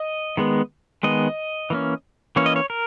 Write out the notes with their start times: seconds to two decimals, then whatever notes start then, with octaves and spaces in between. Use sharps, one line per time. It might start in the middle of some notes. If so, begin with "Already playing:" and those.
Already playing: D#5
0.37 D#3 G#3 B3
1.03 D#3 G#3 B3 D#5
1.70 E3 A#3 C#4
2.36 E3 A#3 C#4 C#5
2.46 D#5
2.56 C#5
2.70 A#4